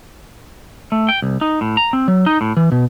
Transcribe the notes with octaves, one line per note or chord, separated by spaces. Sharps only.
A3
G5
C2
D#4
A2
A#5
C4
F#3
D#4
A2
E3
B2